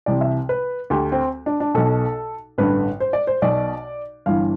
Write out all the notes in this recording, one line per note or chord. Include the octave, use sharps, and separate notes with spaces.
C2 C3 E3 D5
E5
B4
D2 D3 G4
C4
D4
D4
B1 B2 A4
A1 G2 D3 B4
C5
D5
C5
B1 B2 D5
G1 G2 E3 F5